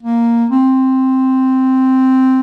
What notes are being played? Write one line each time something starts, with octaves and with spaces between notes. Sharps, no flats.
A#3
C4